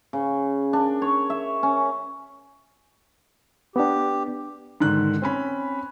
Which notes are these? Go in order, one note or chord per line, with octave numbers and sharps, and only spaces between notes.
C#3
D4
C#5
E5
C#4
B3 D4 G4
G#2 D3 D#3 F#6
C4 C#4 B5